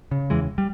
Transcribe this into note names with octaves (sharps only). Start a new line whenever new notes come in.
C#3
E2 E3 G#3
G3